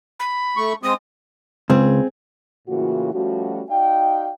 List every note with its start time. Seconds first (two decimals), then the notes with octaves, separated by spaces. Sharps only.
0.20 B5
0.57 A3 C#6
0.83 G#3 C4 D#6
1.70 C#2 C4 G#4
2.68 A2 C#3 E3 A#3 F4 F#4
3.13 F3 G3 A3 C#4 F#4
3.70 D#4 F#4 D5 F5 G5